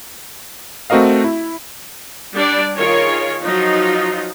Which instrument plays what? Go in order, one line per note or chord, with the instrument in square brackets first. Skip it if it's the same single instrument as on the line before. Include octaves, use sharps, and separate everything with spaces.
[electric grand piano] A3 C4 F#4 A#4 D#5 F5
E4
[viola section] G3 D4 D5
D#3 F4 G#4 A#4 C#5
F3 F#3 D#4 F4